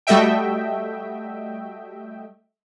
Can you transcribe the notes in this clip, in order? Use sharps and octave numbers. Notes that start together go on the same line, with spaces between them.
G3 A3 F#4 D#5 E5 G5